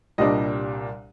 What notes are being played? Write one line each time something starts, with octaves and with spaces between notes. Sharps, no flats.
C2 A#2 G3 D4 D#5